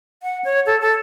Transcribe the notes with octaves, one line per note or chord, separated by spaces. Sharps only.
F#5
C#5
A4
A4